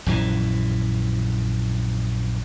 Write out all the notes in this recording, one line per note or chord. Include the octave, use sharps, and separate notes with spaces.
A#1 F#2 E3